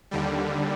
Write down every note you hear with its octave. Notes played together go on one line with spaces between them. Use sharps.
D#2 D3 G3